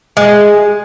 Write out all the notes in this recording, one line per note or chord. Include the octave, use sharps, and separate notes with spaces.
G#3